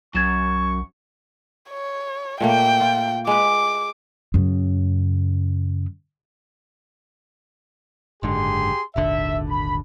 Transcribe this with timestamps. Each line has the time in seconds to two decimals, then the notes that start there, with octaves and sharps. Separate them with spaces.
0.15 B1 F#2 C#6 G#6 A6 E7
1.70 C#5
2.41 A#2 A3 A#3 G5
2.81 F4
3.27 G#3 B4 D6
4.34 F#2 C#3
8.23 F#1 G#2 D3 G4 G#4 C6
8.96 D#1 G#1 D3 E5
9.49 B5